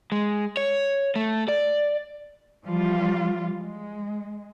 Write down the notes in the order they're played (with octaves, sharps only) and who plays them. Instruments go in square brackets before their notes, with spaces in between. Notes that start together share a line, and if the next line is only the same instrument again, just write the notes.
[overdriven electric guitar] G#3
C#5
A3
D5
[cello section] E3 F3 G3 F4
G#3